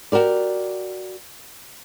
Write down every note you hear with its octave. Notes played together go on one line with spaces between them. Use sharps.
F#4 G4 A#4 D5